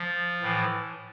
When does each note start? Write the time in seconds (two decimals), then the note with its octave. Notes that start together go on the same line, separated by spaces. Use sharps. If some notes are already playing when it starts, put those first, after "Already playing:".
Already playing: F3
0.41 A2 E3